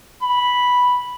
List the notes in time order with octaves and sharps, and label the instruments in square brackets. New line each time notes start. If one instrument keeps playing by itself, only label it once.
[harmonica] B5